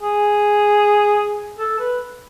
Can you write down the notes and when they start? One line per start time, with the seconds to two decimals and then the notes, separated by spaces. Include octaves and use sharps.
0.02 G#4
1.59 A4
1.79 B4